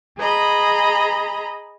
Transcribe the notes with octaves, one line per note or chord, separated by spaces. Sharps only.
G#4 D#5 A#5 B5